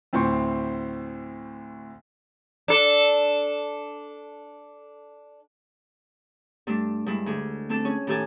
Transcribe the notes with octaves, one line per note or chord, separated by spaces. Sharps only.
D2 A2 C4 C5 C#6
D4 A4
G2 A3 D4
G2 G#3 E4
D2 G#4
A3 C4 D4 A4
C#4 G#4
A2 D#3 G4 A4 G#5